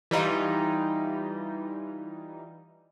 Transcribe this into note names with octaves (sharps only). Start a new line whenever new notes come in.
E3 G3 D#4 F4